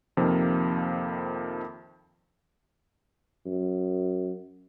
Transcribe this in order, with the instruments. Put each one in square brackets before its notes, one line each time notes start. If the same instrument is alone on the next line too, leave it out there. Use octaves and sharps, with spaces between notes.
[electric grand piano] F2 C3 D#3 F3 A#3
[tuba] F#2